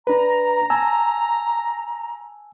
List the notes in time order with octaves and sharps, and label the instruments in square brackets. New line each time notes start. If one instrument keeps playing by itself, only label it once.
[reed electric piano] D4 B4 [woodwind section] A#5
[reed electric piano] G#5 A5 E6